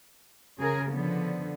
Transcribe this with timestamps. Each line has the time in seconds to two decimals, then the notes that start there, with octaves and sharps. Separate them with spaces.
0.58 C#3 G#4 A#4
0.91 D3 F3 B3